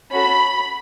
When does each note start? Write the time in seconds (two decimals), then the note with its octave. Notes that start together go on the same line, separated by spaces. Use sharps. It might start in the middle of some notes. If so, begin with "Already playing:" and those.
0.11 C#4 F#4 A4 B5